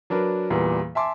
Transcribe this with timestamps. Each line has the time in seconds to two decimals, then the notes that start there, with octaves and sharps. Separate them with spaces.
0.10 F#3 D4 A#4 B4
0.50 E2 A#2 G3 B3
0.95 E5 G#5 A5 C6 D6